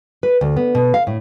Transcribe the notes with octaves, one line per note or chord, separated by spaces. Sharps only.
B4
D2
B3
B2
F5
A2